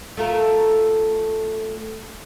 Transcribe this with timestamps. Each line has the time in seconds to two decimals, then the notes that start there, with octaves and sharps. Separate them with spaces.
0.17 A3 F4 A#4